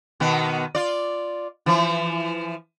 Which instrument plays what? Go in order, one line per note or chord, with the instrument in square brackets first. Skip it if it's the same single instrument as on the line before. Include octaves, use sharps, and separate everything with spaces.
[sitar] B2 D#3 B3
F4 D5
E3 F3